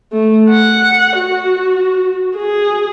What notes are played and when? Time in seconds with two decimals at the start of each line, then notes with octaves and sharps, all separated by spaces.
0.12 A3
0.50 F#5
1.18 F#4
2.37 G#4